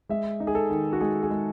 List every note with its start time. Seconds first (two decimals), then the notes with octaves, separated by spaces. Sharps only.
0.09 G#3 E5
0.40 D#4
0.47 G#4
0.55 A4
0.70 D#3
0.93 F#4
1.01 G#3 G#4
1.23 G#4
1.30 G#3